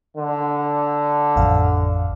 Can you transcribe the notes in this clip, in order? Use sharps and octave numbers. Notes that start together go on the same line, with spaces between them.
D3
A1 F2 F5